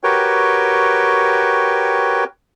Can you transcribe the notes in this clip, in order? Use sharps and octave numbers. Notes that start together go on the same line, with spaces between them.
F#4 G4 A#4 B4 C#5 G5